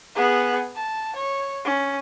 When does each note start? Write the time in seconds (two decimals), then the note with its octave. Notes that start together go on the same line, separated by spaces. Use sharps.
0.16 B3 G#4
0.75 A5
1.15 C#5
1.64 C#4